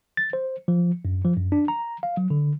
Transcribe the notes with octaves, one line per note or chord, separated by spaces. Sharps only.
A6
C5
F3
F#2
F3
F#2
D4
A#5
F5
F#3
D3